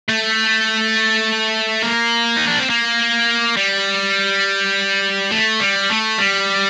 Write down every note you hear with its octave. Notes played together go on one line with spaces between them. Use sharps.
A3
A#3
D#4
D4
C4
A#3
G3
A3
G3
A3
G3